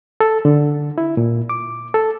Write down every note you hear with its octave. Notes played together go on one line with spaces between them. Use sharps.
A4
D3
E4
A#2
D6
A4